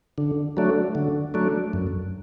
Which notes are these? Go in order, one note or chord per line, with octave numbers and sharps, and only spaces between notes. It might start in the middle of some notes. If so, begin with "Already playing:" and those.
D3
F#3 A3 D4
D3
F#3 A3 D4
F#2